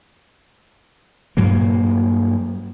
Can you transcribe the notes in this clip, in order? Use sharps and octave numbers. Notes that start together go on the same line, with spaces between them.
G2 A#2 F#3 A#3